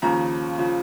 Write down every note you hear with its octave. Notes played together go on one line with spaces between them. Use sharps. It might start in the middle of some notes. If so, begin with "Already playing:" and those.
D#2 C#3 F3 A#5
C#3 F3